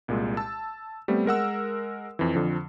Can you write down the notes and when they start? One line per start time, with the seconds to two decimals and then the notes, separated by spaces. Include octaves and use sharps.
0.08 C2 A#2 G#3
0.37 A5 E6
1.08 G3 A3 B3 C4
1.26 G#3 A#4 F#5 E6
2.19 F2 E3
2.35 F2 D3 F3